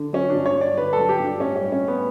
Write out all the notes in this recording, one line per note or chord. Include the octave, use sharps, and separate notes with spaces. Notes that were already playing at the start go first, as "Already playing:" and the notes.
Already playing: D3
F#3 C#4
G2 D4
C#5
G2
D5
D3 B4
A4
F#3
G4
G2 D4
A2 C#4
C#4
G3
C#4
A2
B3